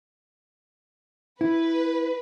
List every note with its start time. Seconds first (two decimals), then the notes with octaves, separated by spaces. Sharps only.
1.41 E4 B4